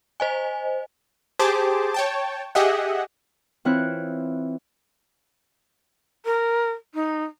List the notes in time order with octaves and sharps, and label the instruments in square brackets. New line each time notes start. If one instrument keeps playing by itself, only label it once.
[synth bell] C5 D#5 G#5
[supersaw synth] G4 G#4 C5 A5 D6
C#5 G5 A5
G4 G#4 D#5 E5 F#5
[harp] E3 C4 E4 F4 C#5 F#6
[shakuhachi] A#4
D#4